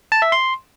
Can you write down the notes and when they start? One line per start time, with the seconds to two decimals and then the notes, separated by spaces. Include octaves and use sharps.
0.12 A5
0.22 E5
0.32 C6